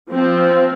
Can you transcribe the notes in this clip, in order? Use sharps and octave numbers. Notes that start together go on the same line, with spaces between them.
F3 C4